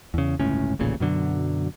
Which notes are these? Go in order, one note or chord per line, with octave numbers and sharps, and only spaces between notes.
E2 C#3
G1 C#2 A2 C#4
D#1 A1 A#2 C#3
F#2 B2 D3 F#3